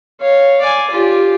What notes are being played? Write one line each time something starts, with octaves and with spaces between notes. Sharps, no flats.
C#5 F5
D5 G#5
F4 G4